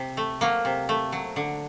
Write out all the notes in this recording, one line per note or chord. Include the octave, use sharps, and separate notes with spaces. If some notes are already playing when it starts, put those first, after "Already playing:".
Already playing: C3
A3
F#3 A#3
C3
A3
F#3
D3